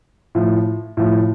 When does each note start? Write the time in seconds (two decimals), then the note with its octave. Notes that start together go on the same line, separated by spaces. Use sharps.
0.35 A2 F3
0.97 A2 F3